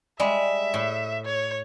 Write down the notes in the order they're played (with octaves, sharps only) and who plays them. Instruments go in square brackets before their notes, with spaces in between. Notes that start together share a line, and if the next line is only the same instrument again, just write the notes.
[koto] G3 G#3 [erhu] E5
[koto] A2
[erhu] C#5